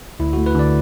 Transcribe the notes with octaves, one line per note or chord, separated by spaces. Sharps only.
D2 E4
A3 F#4
B4
D3 D5